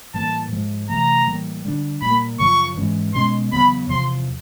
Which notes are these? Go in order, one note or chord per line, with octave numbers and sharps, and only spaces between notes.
A2 E3 G3 A#3 A5
G#2 F3 G#3
C3 E3 A3 A#5
A2 E3 G3 A#3
D3 G3 B3 D4
A#2 G3 A#3 B5
F#2 C#3 F3 C#6
G#2 E3 G#3 C#4
B2 G#3 C#4 C6
E2 C#3 F#3 B3 B5
E2 C3 F3 C6